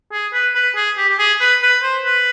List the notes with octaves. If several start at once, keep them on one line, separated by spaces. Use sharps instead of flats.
G#4
B4
B4
G#4
G4
G4
G#4
B4
B4
C5
B4